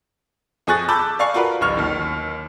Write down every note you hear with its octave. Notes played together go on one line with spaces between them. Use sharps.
F2 G#4 G#5 C#6 F#6 A6
A5 B5 D6 E6 F#6 G6
D5 F5 G#5 C#6 C7
F4 F#4 A#4 B4
D1 A1 C#6 F6
D#2 D#3